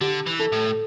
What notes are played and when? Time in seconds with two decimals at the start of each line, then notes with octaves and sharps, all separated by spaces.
0.01 D3 G4
0.26 E3
0.39 A4
0.52 A2